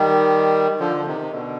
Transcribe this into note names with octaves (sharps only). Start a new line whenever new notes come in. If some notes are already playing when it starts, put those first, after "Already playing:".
Already playing: D#3 G3
D3 F3
F3
C3 D#3
C3
B2 D3